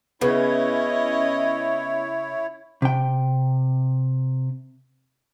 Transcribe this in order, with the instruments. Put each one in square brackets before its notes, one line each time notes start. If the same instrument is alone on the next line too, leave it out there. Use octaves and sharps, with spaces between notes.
[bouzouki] C#3 [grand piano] B3 [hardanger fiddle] C#4 D#5 [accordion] E4 C#5
[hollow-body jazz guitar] C3 G5